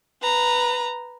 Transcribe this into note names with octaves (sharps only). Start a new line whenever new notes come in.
B4 A#5